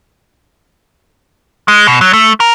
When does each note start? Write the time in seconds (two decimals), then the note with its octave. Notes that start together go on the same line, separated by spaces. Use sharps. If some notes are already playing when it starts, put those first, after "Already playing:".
1.68 G#3
1.87 B2
2.01 F#3
2.13 A3
2.40 A#4